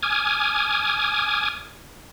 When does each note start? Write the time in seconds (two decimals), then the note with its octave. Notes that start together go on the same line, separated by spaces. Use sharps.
0.03 G#5 D6 D#6 F6 G#6